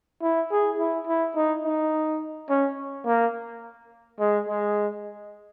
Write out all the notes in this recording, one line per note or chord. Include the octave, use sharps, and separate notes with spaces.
E4
G#4
E4
E4
D#4
D#4
C#4
A#3
G#3
G#3